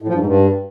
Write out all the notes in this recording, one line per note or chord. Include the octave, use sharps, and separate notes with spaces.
A2
F3
G2
G#2
G2